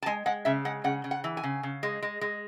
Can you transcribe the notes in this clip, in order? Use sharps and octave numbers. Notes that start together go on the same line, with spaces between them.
A5
G#3 G#5
G#3 F#5
C#3 E5
G#3 F#5
C#3 F#5
C#3
F#5
E3
G#5
C#3
C#3
G#3
G#3
G#3